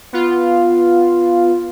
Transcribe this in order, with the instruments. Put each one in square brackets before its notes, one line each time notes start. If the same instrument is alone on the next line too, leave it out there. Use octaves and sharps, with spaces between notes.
[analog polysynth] B3 F4